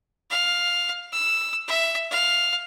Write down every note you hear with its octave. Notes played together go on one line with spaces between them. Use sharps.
F5
E6
E5
F5